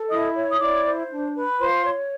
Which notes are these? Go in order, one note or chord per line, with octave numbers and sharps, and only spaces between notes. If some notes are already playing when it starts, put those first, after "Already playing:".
Already playing: A4
E4 D#5 D#6
C#5
D#6
E4 D5 D6
C5
D4
B4
F4 C5 C6
C#5